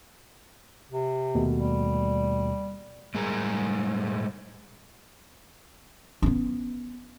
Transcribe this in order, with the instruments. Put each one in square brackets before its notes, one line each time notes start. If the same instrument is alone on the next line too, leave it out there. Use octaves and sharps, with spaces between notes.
[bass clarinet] C3
[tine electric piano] D#2 B2 A3
[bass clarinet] G3
[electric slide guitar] A2 G3 G#3 G#4 A#4 A#5
[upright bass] B3 C#4